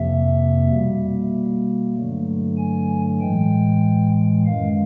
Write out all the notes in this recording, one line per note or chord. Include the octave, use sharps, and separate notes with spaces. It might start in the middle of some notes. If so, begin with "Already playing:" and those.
Already playing: F2 C3 F3 A#3 E5
B2 G3 A#3
G2 D3 F#3 A3
G#5
A2 E3 G#3 G5
F#2 D#3 G#3 F5